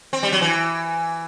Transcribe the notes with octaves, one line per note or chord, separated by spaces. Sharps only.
C4
G3
F#3
E3